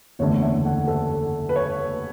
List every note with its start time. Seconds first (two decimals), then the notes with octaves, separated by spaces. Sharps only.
0.19 F#1 E2 D3 A3 C#5
0.42 E5
0.65 F#5
0.87 A4
1.49 B4
1.56 C#5